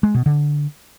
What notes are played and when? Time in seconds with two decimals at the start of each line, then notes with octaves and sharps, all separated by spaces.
0.03 G#3
0.14 B2
0.26 D3